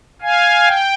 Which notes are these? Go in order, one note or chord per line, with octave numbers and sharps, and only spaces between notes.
F5 G#5
G5